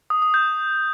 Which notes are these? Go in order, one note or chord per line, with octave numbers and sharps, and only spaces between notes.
D#6
D#6
G6